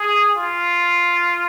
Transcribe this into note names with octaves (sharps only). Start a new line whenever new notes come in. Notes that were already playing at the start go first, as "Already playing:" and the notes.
Already playing: G#4
F4